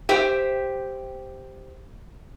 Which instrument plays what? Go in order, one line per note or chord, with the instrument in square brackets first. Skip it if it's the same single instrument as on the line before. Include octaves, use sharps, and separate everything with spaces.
[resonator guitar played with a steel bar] G4 C5 E5 G5